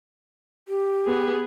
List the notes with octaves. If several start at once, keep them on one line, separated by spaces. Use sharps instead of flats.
G4
B3 G#4